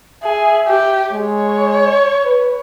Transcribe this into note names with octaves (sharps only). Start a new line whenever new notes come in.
G#4 E5
G4
G#3 C#5
B4